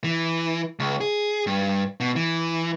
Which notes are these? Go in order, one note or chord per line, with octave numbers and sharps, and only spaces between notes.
E3
C#2
G#4
G2
B2
E3